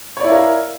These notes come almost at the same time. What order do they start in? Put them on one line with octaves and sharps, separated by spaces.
C#5 D5 E4 F5 A#4